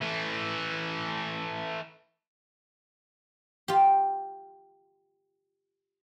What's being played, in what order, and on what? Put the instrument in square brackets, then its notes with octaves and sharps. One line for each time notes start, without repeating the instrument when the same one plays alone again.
[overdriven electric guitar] E3 A3
[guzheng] F4 G4